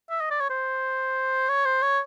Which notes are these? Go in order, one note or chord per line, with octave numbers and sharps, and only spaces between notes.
E5
D#5
D5
C#5
C5
C#5
C5
C#5